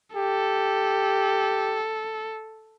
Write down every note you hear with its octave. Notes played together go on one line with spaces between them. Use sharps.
G4 A4